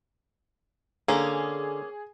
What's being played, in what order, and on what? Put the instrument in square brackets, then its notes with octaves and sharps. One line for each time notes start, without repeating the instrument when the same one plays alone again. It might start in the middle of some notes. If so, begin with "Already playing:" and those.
[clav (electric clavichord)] D3 [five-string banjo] A#3 C#4 [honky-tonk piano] G#4